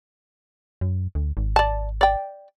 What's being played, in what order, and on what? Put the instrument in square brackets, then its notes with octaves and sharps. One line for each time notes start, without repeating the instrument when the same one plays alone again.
[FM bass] F#2
D2
G#1
[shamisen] D5 A5
D5 G5